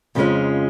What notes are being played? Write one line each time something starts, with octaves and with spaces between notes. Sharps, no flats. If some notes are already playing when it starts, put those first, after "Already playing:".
F2 C#3 F3 G#3 C#4